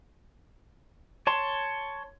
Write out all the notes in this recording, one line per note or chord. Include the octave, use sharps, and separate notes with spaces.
C#5 A5 C6